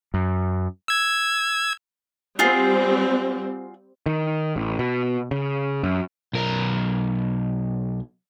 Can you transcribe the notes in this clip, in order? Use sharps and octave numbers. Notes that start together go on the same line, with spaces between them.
F#2
E6 G#6
G3 C4 F4 F#4 G#4
D#3
A1
B2
C#3
F#2
B1 A#4